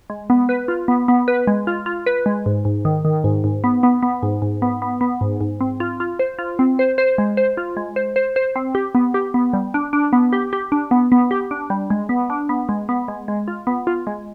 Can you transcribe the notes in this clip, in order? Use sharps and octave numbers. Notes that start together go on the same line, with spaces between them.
G#3
B3
B4
F4
B3
B3
B4
G#3
F4
F4
B4
G#3
G#2
G#2
D#3
D#3
G#2
G#2
B3
B3
B3
G#2
G#2
B3
B3
B3
G#2
G#2
C4
F4
F4
C5
F4
C4
C5
C5
G#3
C5
F4
G#3
C5
C5
C5
C4
G4
B3
G4
B3
G3
D4
D4
B3
G4
G4
D4
B3
B3
G4
D4
G3
G#3
B3
D4
B3
G#3
B3
G#3
G#3
F4
B3
F4
G#3